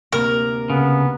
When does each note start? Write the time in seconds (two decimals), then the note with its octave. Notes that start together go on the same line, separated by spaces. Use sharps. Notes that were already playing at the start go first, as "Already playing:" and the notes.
0.13 D2 C3 A#3 A#4
0.70 C#3 B3